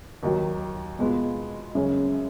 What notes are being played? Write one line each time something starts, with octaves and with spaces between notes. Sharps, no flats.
D#2 D#3 F#3
B2 G#3 B3 F4
F#2 C#3 G#3 C#4